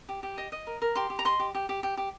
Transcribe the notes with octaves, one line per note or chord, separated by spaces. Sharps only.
G4
G4
D#5
D#5
A#4
A#4
G4 C6
G4
A#5
D#5 C6
G4
G4
G4
G4
G4